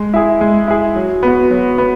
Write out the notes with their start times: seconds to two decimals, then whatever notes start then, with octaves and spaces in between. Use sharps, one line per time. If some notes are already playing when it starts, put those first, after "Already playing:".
Already playing: G#3
0.14 E4 G#4
0.41 G#3
0.68 E4 G#4
0.96 F#3
1.23 B3 F#4
1.51 F#3
1.78 B3